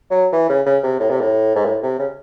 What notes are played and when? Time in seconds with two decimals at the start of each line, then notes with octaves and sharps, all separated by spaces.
0.11 F#3
0.33 E3
0.49 C#3
0.66 C#3
0.83 C3
1.00 A2
1.10 C3
1.21 A2
1.56 G#2
1.65 A2
1.83 C3
1.99 C#3